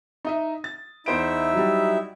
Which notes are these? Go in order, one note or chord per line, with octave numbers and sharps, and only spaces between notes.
D#4 D#5 E5
A6
E2 D#4 E4 C5 E5 D7
F#3 G3